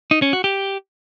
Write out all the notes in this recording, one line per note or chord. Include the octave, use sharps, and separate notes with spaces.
D#4
C#4
F#4
G4